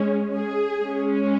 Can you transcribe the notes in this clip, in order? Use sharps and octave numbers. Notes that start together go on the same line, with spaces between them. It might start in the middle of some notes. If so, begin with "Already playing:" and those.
Already playing: G#3 C#4
G#4
G#3 C#4